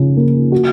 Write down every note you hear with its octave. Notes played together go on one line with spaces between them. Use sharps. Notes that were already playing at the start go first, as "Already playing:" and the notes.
Already playing: C#3 F3 C#4
A#3
F#4